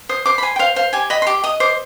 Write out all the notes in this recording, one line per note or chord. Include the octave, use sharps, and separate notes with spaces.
C5 D#6
C5 D6
B5
C5 G#5
G5
C5 F5
C5 F5
G4 G#5
D#5 B5
C6
G4 D6
D#5 D#6
C5 D6